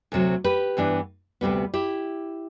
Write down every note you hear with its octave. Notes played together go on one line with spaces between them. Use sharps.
D2 C3 F#3
G4 B4
G2 E3 B3 D4
D2 C3 G3 B3
E4 G4